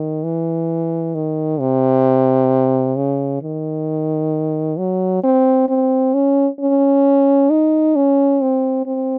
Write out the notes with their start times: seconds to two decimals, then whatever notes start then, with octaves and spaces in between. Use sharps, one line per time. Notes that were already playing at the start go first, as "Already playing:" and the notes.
Already playing: D#3
0.24 E3
1.15 D#3
1.60 C3
2.96 C#3
3.42 D#3
4.78 F#3
5.23 C4
5.69 C4
6.14 C#4
6.60 C#4
7.50 D#4
7.96 C#4
8.41 C4
8.86 C4